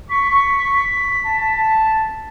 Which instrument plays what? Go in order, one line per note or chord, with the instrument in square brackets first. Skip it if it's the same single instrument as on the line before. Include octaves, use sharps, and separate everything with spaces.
[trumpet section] C#6 [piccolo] B6
[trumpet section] A5